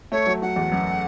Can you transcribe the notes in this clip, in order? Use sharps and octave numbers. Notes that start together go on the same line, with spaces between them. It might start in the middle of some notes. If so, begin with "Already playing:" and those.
A3 C#5
F#3
F#3 F#5
E2
F#2